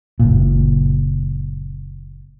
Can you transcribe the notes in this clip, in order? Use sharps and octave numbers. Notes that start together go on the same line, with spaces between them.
F#1 A#2